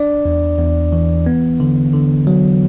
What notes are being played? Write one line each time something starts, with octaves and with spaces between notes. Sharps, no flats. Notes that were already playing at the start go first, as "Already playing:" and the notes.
Already playing: D4 D5
E2
E2
E3
B3
D3
D3
F#3